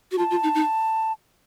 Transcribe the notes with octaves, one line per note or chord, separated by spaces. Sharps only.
F#4
F4 A5
F4
D#4
D#4